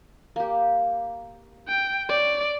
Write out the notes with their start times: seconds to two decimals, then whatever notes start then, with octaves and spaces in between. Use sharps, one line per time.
0.36 A#3 G4
1.68 G5
2.09 C#5 D5